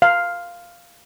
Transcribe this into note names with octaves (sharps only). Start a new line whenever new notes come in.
F5